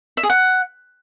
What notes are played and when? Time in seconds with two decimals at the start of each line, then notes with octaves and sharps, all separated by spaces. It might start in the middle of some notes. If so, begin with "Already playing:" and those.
0.17 E5
0.23 G#4
0.30 F#5